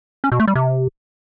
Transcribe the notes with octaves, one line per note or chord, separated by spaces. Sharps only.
C#4
B2
A3
G3
C3